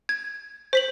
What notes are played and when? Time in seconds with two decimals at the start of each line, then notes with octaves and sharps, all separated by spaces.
0.09 G#6
0.73 C5 B6 F#7